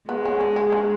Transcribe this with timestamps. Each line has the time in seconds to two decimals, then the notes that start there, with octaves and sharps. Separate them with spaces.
0.09 G#3 B3
0.25 C#4
0.41 D4
0.56 G#4
0.72 D4